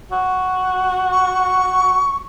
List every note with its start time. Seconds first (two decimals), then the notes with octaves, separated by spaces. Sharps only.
0.12 F#4
1.12 C#6